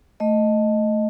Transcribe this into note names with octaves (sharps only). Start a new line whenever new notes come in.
A3 D#5